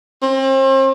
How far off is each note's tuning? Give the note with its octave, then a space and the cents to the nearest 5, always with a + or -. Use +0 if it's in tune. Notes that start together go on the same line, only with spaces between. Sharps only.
C4 +40